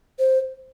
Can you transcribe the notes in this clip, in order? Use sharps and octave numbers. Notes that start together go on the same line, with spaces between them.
C5